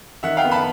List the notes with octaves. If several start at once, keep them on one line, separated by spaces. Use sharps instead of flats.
D#3 E5 F#5
F5 G5
B3
A5 B5